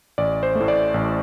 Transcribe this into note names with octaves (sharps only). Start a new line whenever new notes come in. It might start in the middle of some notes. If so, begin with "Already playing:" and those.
A1 D5
C5
A3
A2
D5
A1